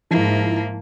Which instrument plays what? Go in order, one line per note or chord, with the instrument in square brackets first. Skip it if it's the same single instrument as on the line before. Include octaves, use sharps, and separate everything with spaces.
[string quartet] G#2 A#3 [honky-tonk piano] F3 E4